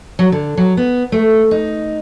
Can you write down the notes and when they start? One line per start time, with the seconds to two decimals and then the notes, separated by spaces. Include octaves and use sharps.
0.19 F#3
0.32 D3
0.57 F#3
0.77 B3
1.12 A3
1.51 D#4